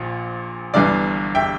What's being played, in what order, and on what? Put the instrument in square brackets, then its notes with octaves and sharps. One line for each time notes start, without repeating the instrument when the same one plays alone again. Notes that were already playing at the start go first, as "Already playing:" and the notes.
Already playing: [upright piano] A#1 A#2 F3
G1 G2 E3 D5 F5
E5 G5